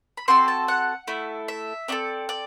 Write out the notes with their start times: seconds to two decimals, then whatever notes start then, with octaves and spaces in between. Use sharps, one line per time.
0.17 B5
0.28 C4 F#4 A4 C6
0.48 A5
0.68 F#5
1.07 A3 E4 A4
1.48 E5
1.88 C4 F#4 A4 D5
2.29 D5